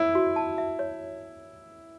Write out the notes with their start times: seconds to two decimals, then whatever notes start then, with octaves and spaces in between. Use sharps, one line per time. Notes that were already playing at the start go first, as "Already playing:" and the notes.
Already playing: E4 C#5
0.15 F#4
0.36 A5
0.58 E5
0.79 C#5